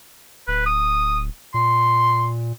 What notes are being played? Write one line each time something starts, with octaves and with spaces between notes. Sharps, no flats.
D1 B4
D#6
A#2 C6